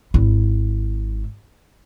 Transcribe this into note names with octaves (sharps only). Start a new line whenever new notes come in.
G#1 E4